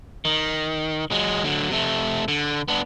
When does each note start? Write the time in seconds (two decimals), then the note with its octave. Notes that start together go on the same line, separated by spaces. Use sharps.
0.25 D#3
1.11 F#3 G#3
1.44 D3 F#3
1.70 C3 A3
2.28 D3
2.68 B3 D4